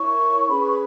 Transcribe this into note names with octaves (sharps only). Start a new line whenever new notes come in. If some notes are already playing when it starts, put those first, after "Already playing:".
Already playing: E4 A#4 C#5 C#6
C#4 G#4 B4 B5
C#6
B5